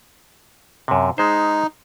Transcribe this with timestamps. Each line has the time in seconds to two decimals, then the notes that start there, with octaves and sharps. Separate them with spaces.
0.88 F#2 C3
1.18 G#3 D#4 C5